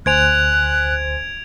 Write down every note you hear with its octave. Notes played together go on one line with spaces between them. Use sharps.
D2 C5 G#5 F#6 G#6 D7 F7